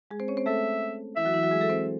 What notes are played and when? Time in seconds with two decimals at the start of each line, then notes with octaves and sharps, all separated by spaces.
0.11 G#3 G#4
0.20 C4 C5
0.28 C#4 C#5
0.37 C4 C5
0.46 A3 A4 E5
1.16 E3 E4 E5
1.25 F#3 F#4
1.34 E3 E4
1.43 F#3 F#4
1.51 G#3 G#4
1.61 A4
1.69 C4 C5